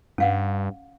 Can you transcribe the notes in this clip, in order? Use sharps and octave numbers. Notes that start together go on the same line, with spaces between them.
G2 C#4 F5 F#5